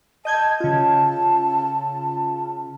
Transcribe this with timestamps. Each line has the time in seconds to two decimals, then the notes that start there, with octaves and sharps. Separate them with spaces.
0.25 D#5 A5 G6 G#6
0.60 C#3 F4